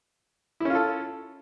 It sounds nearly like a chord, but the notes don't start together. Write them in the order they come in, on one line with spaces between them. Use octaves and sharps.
E4 C#4 F4 A4